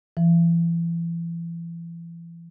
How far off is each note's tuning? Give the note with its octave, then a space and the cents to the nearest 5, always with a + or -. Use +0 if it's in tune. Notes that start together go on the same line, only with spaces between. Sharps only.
E3 +35